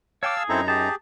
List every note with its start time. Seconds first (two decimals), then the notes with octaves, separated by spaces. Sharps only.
0.23 C#5 F5 G5 A5 D6 E6
0.37 G#4
0.49 F#2 C4 D#4 E4 A4 A#5
0.68 G4 G#4 A5